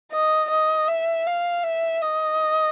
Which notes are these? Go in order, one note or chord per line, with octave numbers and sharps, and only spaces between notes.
D#5
D#5
E5
F5
E5
D#5